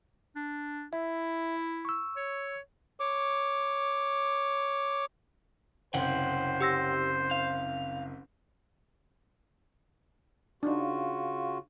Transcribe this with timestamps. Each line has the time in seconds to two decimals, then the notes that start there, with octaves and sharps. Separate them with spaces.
0.36 D4
0.93 E4 E5
1.85 C#6 E6
2.16 C#5
3.00 C#5 D6
5.94 F#1 C2 C5 C#5 F#5 G5
6.61 G4 E6 A#6
7.31 F5 G6
10.63 C#3 D4 D#4 F4 F#4